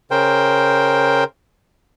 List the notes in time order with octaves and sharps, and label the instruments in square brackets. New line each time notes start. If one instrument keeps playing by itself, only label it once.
[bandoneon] C#3 A#4 C5 G5